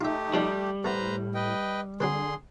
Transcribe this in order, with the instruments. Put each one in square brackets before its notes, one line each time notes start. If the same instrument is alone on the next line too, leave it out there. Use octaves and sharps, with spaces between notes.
[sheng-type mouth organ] A3 G4 [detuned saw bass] D#4 [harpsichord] F4 E5
[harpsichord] B2 F3 D4 [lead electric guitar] G3
[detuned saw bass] A2 [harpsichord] A3 B3 [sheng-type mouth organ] B4 C5 A#5
[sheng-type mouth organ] B4 D#5 G5
[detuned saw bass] D3 [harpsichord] F#3 C4 B4 [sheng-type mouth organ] G#4 C6